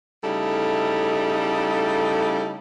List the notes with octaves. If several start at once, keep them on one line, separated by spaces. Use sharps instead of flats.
C#3 G3 A3 D#4 E4 A4